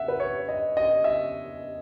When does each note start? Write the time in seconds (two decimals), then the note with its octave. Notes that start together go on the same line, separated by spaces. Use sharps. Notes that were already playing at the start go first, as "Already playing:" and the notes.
Already playing: E5 F#5
0.08 B4
0.20 C#5
0.49 D#5
0.77 D#5
1.04 E5